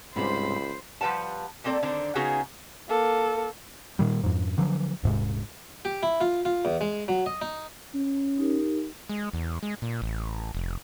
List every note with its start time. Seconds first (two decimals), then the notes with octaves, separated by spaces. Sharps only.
0.16 C#2 G#2 C3 G3 C5 B5
1.01 F3 G3 B4 F#5 A5
1.64 A3 A#3 C4 A4 D5
1.83 D3 D#3 C4 D4
2.15 C#3 B3 C#4 D#4 F#4 G#4
2.88 A#3 A4
3.99 A#2 D#3 G3
4.23 F2 G#2
4.58 D3 F3 F#3
5.03 D#1 G#2 C3 G#3
5.85 G4
6.03 E4
6.21 F4
6.45 F4
6.65 E2
6.81 G#3
7.08 F#3
7.26 D#5
7.41 D#4
7.94 C#4
8.38 D#4 G4 A#4
9.09 G#3
9.33 E2
9.63 G#3
9.82 A#2
10.02 A1
10.55 F1